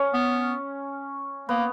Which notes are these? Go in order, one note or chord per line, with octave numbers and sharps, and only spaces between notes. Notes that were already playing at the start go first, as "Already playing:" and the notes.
Already playing: C#4
B3
A#3 B3